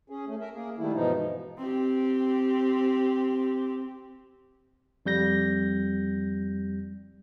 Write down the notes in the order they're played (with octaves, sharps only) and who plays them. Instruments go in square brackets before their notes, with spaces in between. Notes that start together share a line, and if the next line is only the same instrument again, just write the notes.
[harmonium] C#4 G#4
A3 C#4
A#4 E5
A#3 G#4
D#3 G3 A3 E4
G2 B2 E3 F3 G#3 D#4
[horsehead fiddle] C4 G4
[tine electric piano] F2 G3 G6 A#6